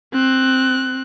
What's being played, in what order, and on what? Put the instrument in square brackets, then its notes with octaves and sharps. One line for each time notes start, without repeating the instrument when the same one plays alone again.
[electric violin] C4 F#6